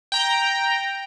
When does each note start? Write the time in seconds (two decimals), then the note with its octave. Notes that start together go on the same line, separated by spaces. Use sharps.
0.12 G5 A#5